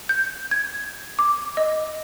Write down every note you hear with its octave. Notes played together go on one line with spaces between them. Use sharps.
G6
G#6
D6
D#5